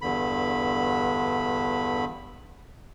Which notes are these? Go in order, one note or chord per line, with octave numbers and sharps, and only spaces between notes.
E2 G2 D3 B5